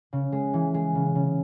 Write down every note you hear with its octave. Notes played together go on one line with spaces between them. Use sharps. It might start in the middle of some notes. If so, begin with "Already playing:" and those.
C#3
G#3
E3
G#3
C#3
C#3